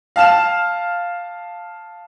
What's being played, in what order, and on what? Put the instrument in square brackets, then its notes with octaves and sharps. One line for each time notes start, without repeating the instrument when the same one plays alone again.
[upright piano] F5 A5 F6 E7